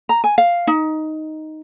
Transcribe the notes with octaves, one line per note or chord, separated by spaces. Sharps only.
A#5
G#5
F5
D#4